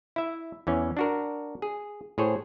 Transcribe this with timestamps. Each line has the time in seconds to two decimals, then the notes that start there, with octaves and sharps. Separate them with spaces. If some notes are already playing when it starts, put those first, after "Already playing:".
0.16 E4 E5
0.67 E2 E3 C#4
0.97 D4 F#4 A#4
1.62 G#4
2.18 A2 G#4 C5 C#5